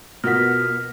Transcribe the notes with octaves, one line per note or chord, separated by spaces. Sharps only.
B2 B3 F4 A#4 F#5 F6 A#6 B6